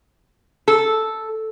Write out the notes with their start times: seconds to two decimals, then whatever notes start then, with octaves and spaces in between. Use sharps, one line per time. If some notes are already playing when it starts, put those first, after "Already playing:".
0.68 A4